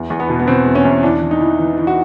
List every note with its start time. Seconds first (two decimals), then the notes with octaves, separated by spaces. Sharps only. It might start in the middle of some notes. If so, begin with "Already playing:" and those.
Already playing: E2
0.10 E2
0.20 B3
0.29 B2
0.40 B3
0.47 B2 C4
0.66 E2
0.75 C#4
0.85 E2
1.03 E3 D4
1.22 E3
1.31 D#4
1.40 E3
1.59 E3
1.78 E3
1.87 F#4